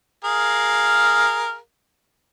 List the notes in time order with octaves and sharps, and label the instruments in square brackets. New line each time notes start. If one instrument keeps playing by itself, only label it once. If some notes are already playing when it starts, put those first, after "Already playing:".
[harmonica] G#4 A#4 F5